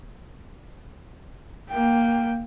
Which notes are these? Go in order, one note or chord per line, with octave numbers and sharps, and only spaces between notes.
A#3 G5